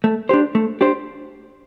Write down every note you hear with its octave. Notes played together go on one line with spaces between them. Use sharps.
A3
D4 G4 C5
A3
D4 G4 C5